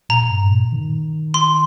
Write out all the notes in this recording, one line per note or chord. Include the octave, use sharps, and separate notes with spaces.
A#2 A#5
G2
A#2
D#3
C6